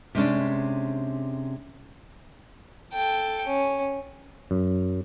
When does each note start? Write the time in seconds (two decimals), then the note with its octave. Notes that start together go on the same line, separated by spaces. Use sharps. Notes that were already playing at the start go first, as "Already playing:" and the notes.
0.15 C3 G#3 C#4 D4
2.93 A4 G5
3.47 C#4
4.51 F#2